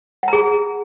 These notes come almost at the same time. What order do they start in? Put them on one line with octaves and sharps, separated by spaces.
F#5 A#5 G#4